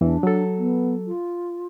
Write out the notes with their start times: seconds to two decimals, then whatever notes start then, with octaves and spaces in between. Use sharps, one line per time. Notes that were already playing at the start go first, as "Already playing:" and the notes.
0.01 E2 E3 D4
0.23 F#3 A4
0.57 B3
1.06 F4